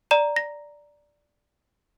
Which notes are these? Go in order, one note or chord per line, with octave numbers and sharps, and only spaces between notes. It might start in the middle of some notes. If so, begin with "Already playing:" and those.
D5 A#5 E7
A#6